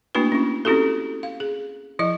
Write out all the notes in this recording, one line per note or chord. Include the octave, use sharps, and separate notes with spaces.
A3 A#3 D4 E4 F#4 B4
C#4 E4
C4 C#4 E4 F#4 G4 A4
F5
G#4
F3 E4 D#5